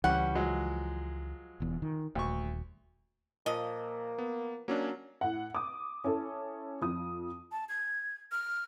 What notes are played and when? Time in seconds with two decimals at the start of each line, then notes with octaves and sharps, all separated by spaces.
0.04 C#2 E3 G3 C#4 F#5
0.35 F3 F#3 G#3
1.60 E1 E2
1.82 D#3
2.15 D#1 D2 C#6
3.46 A#2 F3 A#3 D#5
4.18 B3
4.68 F#3 A#3 C#4 D4
5.21 A2 F#5
5.55 D6 D#6
6.04 C#4 E4 A4
6.81 F2 F3 D#6
7.52 A5
7.69 G#6
8.32 F6